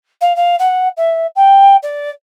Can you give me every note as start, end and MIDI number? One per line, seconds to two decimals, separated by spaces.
0.21 0.35 77
0.36 0.55 77
0.59 0.88 78
0.97 1.27 76
1.36 1.76 79
1.83 2.10 74